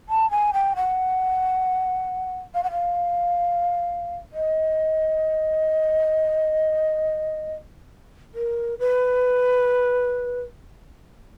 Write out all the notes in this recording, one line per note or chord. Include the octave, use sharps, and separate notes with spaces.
A5
G#5
G5
F#5
F5
F#5
F5
D#5
A#4
B4